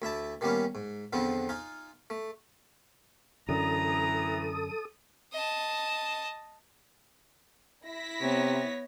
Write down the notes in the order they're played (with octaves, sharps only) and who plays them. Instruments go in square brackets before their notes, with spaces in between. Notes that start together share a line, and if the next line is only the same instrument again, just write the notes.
[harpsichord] D2 E4 E5 A5
D#3 E3 G3 A#3 B3 C#4
G#2
E2 D3 F3 B3 C4
D#4 F4 G#5
A3
[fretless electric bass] F#2 D3 [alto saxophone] E3 [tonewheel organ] A4 D#6 [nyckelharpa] A#5
[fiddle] D#5 A5
[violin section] E4 A#6 B6
[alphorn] C3 [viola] B3 C#5